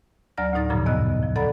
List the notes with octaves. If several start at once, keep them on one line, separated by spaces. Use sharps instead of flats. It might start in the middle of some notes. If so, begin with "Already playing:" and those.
D2 F#3 D5 A#5 F6 A#6
D2 A2 D#4 A6
G2 A#2 C#3 F3 A#5 A6
E2 B3 D#5 E6 F#6
F3
A4 D5 F#5 A#5 B5